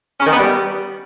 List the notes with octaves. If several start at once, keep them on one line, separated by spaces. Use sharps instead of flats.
C#4
D#3
B3
G3